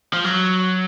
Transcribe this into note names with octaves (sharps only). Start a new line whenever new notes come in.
F3
F#3